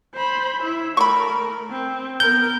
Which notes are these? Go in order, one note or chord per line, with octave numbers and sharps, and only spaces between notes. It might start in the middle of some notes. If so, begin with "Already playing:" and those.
C5 B5
E4 E5
A3 A#4 B5 C#6
C4
B3 A#4 G6